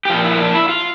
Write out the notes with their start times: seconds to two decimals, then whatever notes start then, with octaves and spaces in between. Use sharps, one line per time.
0.05 G4
0.10 A#2 F3 F4
0.24 E4
0.40 D4
0.54 E4
0.69 F4